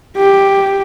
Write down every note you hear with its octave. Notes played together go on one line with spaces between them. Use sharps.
G4